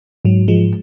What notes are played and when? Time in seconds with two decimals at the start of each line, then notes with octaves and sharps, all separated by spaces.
0.25 G#2 F#3
0.48 F3 G#3